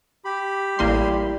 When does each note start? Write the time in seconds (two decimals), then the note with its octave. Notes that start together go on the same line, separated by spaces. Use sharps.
0.25 G4 B5
0.79 A1 G3 A#3 E4 C6